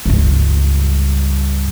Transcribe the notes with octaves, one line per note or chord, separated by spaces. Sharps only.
C#2 G2